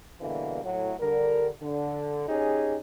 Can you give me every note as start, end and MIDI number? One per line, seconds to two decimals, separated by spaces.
0.21 0.63 47
0.21 0.63 50
0.21 0.63 52
0.21 0.63 55
0.21 0.63 58
0.21 0.63 59
0.64 0.94 45
0.64 0.94 54
1.00 1.49 50
1.00 1.49 55
1.00 1.49 70
1.61 2.25 50
2.29 2.76 61
2.29 2.76 63
2.29 2.76 67
2.29 2.76 68